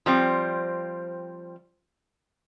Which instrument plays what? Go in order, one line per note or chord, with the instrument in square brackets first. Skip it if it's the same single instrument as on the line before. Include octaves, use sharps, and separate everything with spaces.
[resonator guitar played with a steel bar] F3 G3 C4